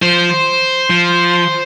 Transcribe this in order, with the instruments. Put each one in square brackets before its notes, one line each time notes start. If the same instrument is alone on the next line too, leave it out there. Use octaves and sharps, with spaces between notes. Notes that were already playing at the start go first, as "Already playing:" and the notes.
[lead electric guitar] F3 [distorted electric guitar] C5
[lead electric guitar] F3